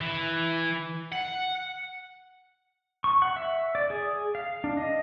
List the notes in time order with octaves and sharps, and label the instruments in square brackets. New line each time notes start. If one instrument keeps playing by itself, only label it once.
[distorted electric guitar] E3
F#5
[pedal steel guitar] C#6
F#5
E5
D5
G#4
F5
D4
D#5